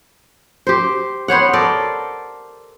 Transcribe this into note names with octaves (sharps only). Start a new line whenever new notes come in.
G4 C5
B3 C5 C#5 F#5
A4 A#4 C5 D5